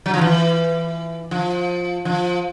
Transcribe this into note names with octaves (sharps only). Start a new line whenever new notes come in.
F#3
F3
E3
F3
F3